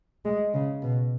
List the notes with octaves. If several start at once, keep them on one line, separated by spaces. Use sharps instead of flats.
G#3
C#3
B2